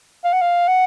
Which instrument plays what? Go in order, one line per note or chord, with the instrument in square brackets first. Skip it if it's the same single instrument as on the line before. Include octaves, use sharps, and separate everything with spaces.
[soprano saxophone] F5
F#5
F5
F#5